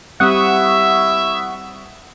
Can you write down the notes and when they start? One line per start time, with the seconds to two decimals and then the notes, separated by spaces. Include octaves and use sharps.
0.20 G3 C4 E4 G4 E5 F#5 C#6 D#6